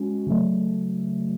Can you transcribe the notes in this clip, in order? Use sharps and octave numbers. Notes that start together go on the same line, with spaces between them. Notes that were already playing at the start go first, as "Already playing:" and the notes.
Already playing: G#3 C#4 F#4
C#3 F#3 A3